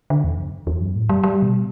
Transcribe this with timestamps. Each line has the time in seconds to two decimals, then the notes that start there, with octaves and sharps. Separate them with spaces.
0.10 D3
0.24 E2
0.38 F#2
0.67 E2
0.81 F#2
0.96 A2
1.09 G3
1.23 G3
1.42 B2